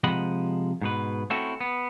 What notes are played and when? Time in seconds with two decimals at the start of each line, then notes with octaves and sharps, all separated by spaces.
0.04 C3 F3 G#3 D#5 F#5 B5
0.82 G#2 B2 B4
1.30 A3 C4 C#4 E4 F#4 A4
1.61 B3